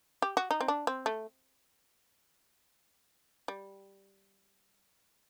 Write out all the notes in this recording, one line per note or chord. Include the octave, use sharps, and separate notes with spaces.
G4
F#4
D#4
C4
D4
C4
A3
G3